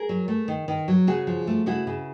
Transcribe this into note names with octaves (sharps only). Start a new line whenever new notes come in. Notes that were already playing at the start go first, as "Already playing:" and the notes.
Already playing: G#4 A#4
F#3
A3
D#3
D#3
F#3
C#3 F#4 G#4
F3
A3
C#3 E4 F#4
C#3